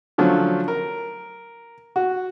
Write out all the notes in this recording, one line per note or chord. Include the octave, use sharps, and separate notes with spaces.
D3 F3 F#3 A3 C#4
A#4
F#4